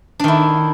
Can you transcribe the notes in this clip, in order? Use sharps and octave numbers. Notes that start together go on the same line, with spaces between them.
D#3 D4 E4